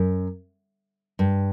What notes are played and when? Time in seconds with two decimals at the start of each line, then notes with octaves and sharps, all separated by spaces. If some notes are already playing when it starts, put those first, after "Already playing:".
Already playing: F#2
1.19 G2